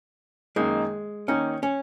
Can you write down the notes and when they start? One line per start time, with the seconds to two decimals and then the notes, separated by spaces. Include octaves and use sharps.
0.56 F#2 D#3 G#3 A#3 D#4
1.28 D#3 A#3 C#4 D#4
1.63 C#4